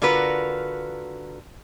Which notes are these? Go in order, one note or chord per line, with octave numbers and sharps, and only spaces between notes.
D3 F4 F#4 A#4 B4